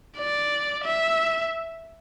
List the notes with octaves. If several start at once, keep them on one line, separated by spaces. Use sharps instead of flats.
D5
E5